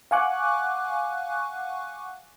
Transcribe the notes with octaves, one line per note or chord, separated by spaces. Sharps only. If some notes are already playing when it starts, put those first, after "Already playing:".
F5 F#5 G#5 C#6 D6 F#6